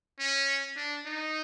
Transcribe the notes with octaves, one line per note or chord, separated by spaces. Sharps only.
C#4
D4
D#4